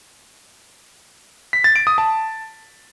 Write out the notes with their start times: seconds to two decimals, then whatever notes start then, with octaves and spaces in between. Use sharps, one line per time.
1.53 B6
1.64 A6
1.76 D7
1.87 D#6
1.98 A5